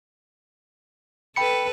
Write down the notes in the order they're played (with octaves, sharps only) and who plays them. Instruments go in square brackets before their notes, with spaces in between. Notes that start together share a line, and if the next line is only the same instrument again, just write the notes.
[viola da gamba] A4 B4 [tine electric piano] G5 B5 C#7